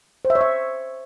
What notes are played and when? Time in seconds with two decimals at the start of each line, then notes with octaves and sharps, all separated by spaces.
0.25 C5
0.30 E5
0.35 C#5
0.41 E5